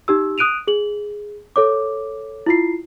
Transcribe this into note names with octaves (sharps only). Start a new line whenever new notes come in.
D#4 G4 E6
D#6 F#6 D7 D#7 F7
G#4 F#7
A4 C#5 D6
E4 F4 C7